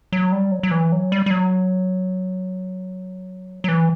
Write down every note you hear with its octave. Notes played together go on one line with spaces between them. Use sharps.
F#3
G3
F#3
F#3
E3
F#3
G3
G3
F#3
F#3
E3